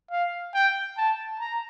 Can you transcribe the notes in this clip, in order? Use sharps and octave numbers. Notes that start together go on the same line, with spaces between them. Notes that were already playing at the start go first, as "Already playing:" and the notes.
F5
G5
A5
A#5